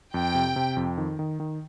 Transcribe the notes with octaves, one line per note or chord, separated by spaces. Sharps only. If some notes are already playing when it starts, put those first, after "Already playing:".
F2 G5
C3
C3
F2
D#3
D#3
D#3